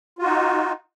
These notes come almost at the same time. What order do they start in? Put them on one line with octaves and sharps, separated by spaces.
F4 F#4 D#4